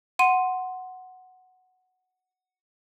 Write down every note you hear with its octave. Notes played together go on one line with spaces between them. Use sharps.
F#5 C6 D#7